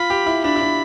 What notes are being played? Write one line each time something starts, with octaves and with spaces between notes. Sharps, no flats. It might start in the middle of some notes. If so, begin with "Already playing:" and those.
Already playing: F4 B5
G4
E4
D4 B5
E4
D4